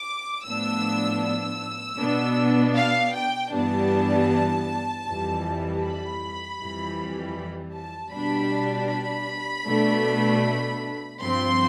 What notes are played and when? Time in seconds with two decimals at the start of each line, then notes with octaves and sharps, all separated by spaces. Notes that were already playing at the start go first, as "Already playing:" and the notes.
Already playing: D6
0.45 A2 F3 B3 D4 E6
1.22 E6
1.98 B2 B3 D4
2.76 F5
3.14 G5
3.52 G2 E3 G3 B3 D4 A5
5.06 F2 E3 G3
5.82 B5
6.60 F2 E3 G3
7.75 A5
8.13 B2 G3 D4 B5
8.90 B5
9.67 B2 A3 D4
11.21 G2 F3 C4 C6